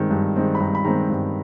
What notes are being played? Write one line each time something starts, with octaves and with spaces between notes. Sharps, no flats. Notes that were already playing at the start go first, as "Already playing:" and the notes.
Already playing: G2 D#3 G#3 C4
G2
D#3 G#3 C4
B5
G2 A#5
B5
D#3 G#3 C4 A#5
G2